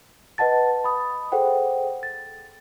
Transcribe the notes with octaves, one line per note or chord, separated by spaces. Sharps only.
B4 D#5 F#5 A5 A6
B5 D#6
G#4 A4 C5 F#5 G5
A6